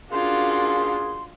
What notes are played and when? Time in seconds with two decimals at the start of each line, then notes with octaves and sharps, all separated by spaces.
0.12 A#3 C#4 D4 F4 F#4 G#4 C6